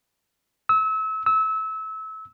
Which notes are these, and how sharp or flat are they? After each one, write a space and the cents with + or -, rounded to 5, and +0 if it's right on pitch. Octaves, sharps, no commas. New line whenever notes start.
E6 -30
E6 -25